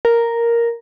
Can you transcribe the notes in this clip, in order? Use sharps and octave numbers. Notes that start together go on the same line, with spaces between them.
A#4